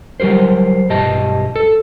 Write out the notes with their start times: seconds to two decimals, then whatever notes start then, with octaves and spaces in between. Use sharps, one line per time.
0.20 F#3 G3 G4 A#4 C5
0.89 B1 G2 G4 D#5 A5
1.56 A4